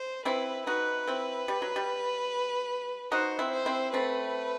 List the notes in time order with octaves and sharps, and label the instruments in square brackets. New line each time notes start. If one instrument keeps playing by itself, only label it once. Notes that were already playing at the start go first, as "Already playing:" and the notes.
Already playing: [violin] C5
[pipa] C4 E4 [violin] B4
[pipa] D#4 F#4 [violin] B4
[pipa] C4 E4
G3
F#3
G3
[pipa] D#4 F#4 [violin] C5
[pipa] C4 E4
[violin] C5
[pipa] C4 E4
[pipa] A3 C4 [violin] B4